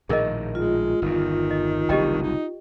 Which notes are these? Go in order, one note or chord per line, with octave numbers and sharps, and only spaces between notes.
A#1 A2 D#3 G#4 A#4 D#5
G#3 F4
G1 E2 D#3
D#5
F#1 C2 D3 G4 D#5 G5
D#4